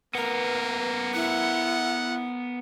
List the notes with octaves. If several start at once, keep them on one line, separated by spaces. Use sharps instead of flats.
A#3 B3 A#4 B4
E4 F#5